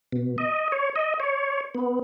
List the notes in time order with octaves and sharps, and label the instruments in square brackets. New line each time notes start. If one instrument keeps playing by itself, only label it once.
[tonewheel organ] B2
D#5
C#5
D#5
C#5
B3